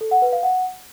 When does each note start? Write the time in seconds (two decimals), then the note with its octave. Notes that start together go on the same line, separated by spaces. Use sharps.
0.01 A4
0.11 F#5
0.22 B4
0.32 F5
0.43 F#5